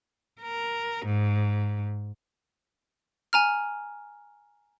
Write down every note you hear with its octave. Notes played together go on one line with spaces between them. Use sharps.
A#4
G#2
G#5 A#5 F6